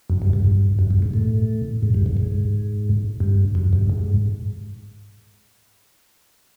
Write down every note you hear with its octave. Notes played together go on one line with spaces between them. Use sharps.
F#2
G2
G2
G2
F#2
G2
G#2
A2
G#2
G2
G#2
G#2
G2
F#2
G2
G#2